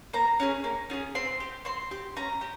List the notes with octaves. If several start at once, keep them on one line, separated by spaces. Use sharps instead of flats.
A#3 A#5
C#4 F4 G#4
A#3
C#4 F4 G#4
C4 C6
G4
C4 C6
G4
C#4 A#5
G4